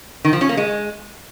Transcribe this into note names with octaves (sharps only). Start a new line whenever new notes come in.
D#3
F3
C#4
A#3
G#3